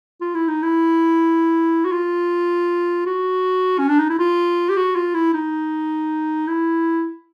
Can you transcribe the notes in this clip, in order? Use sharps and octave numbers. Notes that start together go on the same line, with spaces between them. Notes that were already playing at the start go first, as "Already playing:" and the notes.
F4
E4
D#4
E4
F#4
F4
F#4
C#4
D4
D#4
E4
F4
G4
F#4
F4
E4
D#4
E4